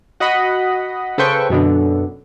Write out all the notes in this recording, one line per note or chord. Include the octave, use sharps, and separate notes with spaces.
F#4 D#5 F#5 B5
C#3 A4 B4 C5 G5 C#6
F#2 B2 D3